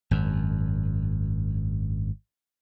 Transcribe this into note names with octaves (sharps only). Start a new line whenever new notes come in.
G#1 F#2